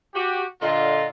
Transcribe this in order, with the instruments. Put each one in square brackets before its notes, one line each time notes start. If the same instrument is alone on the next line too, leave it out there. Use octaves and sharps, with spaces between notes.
[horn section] F#4 G4
[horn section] A#2 D3 F4 [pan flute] D#5